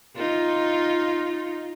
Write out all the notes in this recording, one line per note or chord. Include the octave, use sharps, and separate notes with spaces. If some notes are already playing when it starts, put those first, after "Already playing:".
D#4 F4